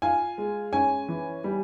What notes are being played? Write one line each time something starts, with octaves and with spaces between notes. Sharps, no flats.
F4 G#5
G#3
C#4 G#5
E3
G3